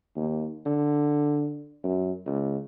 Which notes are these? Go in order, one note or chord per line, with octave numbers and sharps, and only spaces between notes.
D#2
D3
F#2
C#2